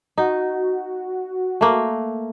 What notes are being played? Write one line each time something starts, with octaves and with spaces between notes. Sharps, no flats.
D#4 F#4
A3 A#3